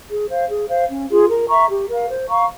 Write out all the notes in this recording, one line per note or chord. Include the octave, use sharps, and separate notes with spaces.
G#4
C5 F5
G#4
C5 F5
C#4
F4 G#4
A#4
E5 A#5 C#6
G4
A#4
F5
C5
F5 A#5 C#6